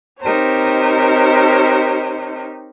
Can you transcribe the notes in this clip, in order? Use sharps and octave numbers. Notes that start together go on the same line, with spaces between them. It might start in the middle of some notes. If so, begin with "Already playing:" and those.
C4 D#4 G4 A#4 C5 C#5